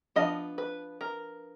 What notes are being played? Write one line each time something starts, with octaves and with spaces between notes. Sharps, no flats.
F3 B3 D4 D#5
B4
A#4